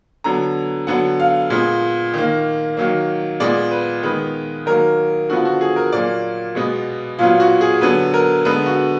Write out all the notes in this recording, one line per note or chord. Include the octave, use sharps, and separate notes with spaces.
D3 F#3 B3 A#5
D3 F#3 B3 F#5
F5
A#2 G#3 B3
D#3 A#3
D#3 F#3 A#3
A#2 G#3 B3 D5
B4
D#3 G#3 B3 B4
D#3 F#3 A#3 A#4
D3 F3 B3 F#4
F#4
G#4
A#4
A#2 F#3 A#3 D5
B2 G#3 B3
A#2 F#3 B3 F4
F#4
G#4
D3 F#3 B3 B4
A#4
D3 G#3 B3 B4
F#4